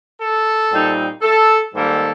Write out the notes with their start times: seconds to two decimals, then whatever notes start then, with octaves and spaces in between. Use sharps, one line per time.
0.19 A4
0.71 A#2 G3 C4 D#4
1.22 A4
1.74 G#2 D#3 G3 A#3 A4